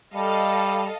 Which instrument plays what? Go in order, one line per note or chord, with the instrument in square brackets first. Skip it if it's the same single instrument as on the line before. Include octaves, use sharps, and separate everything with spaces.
[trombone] G3 [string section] A4 D#5 F5